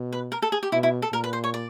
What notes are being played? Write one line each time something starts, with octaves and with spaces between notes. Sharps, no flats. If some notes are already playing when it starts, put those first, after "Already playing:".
Already playing: B2
B4
A#4
A4
G#4
G4
B2 E4
E4
A4
A#2 A#4
B4
C5
C#5
D5